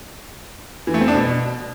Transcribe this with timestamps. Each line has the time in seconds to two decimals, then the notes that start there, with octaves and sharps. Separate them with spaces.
0.87 E3
0.94 A3
1.01 C4
1.08 D4
1.15 B2